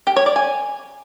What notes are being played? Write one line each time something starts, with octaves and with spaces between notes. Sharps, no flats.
G4
C#5
D5
G#5